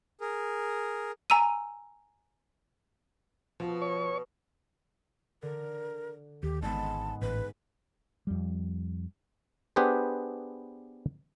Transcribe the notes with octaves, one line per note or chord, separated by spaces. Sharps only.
G#4 A#4
G#5 A#5 E6 D#7
B2 F3
C#5 C#6
D3 A#4
D#2 G4
G#1 G#2 G#3 B3 A5
A1 B4
F2 G3
B3 D4 G4 G#4 B4 C5